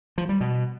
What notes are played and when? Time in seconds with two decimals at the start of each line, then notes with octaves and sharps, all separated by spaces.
0.18 F3
0.29 G3
0.41 B2